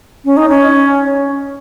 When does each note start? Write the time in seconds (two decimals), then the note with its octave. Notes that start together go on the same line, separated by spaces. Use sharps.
0.25 C#4
0.37 D#4
0.49 C#4